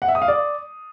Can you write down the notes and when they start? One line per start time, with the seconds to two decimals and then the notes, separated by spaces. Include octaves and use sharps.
0.02 F#5
0.08 E5
0.15 D#6
0.22 F5
0.28 D5